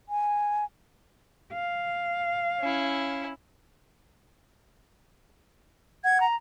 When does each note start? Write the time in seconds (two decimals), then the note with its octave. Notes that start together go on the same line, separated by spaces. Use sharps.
0.09 G#5
1.53 F5
2.60 C#4 E4
6.04 F#5 G#6
6.20 A#5